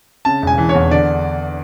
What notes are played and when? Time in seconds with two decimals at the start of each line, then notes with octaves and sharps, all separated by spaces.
0.25 C#3 A5
0.42 E1
0.47 G#5
0.58 E3
0.69 C#5
0.75 E2
0.91 D3 D5